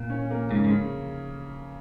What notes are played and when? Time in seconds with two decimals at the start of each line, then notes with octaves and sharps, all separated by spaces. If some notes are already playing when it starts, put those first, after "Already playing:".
Already playing: A#2
0.10 C#4
0.31 A#3
0.50 G#2 C#3
0.64 G#2
0.70 C#3